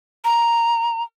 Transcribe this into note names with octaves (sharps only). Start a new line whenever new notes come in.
A#5